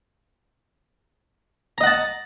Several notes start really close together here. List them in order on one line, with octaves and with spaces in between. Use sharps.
A#5 D#5 F#5 A5